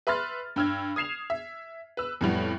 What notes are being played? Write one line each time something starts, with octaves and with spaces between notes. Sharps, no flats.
B4 E5 B5 C6 F6 A6
G2 G5 E6 F6 G#6
D#6 G#6 C7 E7 F7
E5
B4 E6
F2 A2 G3 B3